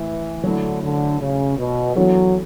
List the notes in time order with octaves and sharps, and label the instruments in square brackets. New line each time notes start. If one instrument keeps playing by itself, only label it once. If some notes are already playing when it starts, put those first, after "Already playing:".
Already playing: [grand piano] A2 [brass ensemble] E3
[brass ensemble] D3 [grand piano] F#3 A3 E4
[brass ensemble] D3
C#3
B2
[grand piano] E3 B3 D4 F#4 A4 [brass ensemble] F#3